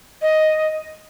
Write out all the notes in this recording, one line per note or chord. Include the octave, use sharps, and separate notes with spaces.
D#5